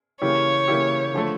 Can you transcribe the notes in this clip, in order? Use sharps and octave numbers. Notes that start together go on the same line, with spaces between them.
C#3 E3 A#3 E4 G4 C#5
C#3 E3 A#3 E4 G4
D3 F3 A3